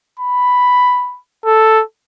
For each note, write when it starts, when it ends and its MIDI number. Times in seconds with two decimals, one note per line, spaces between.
0.20 1.19 83
1.45 1.82 69